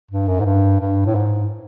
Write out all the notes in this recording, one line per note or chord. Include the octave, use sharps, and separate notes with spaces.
G2
F#2
G#2
G2
G2
A2
G#2